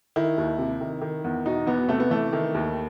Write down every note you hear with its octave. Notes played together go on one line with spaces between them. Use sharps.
D#3 E4
D#2
C3
D#3
D#3
E2
B2 D#4
E2 B3
C3 A3
B3
E3 A3
D#3
D#2